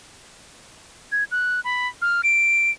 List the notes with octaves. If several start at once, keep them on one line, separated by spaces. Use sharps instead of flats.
G#6
F#6
B5
F6
D7